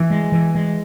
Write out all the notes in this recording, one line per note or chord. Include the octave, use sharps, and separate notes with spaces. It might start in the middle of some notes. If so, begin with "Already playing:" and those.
Already playing: E3
G#3
E3
G#3